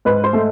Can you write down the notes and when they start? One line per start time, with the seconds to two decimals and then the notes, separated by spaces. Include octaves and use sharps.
0.05 G#2 B4
0.24 C5
0.33 A3